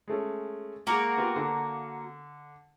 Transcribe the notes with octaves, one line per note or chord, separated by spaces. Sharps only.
G#3 A3 C#4
G#3 A#3 F#4 A#4
B3 F4 G4
D3